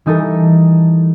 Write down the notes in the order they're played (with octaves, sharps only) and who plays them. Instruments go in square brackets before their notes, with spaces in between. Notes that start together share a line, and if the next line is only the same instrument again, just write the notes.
[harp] E3 G3 D#4 G4 A4 A#4